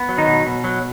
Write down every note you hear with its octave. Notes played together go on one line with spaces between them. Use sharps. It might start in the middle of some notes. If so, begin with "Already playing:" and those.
Already playing: B3
F#3
D#3 D#4
B2
B2
F#3